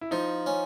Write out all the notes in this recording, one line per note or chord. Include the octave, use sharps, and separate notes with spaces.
E4
F3 D#4
C#4